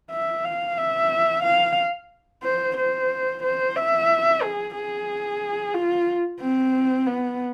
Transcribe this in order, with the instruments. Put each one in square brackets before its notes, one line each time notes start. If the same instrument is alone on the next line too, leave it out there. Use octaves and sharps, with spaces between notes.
[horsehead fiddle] E5
F5
E5
F5
C5
C5
C5
E5
G#4
G#4
F4
C4
B3